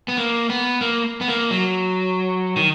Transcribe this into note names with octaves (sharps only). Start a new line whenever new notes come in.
B3
A#3
B3
A#3
B3
A#3
F#3
D#3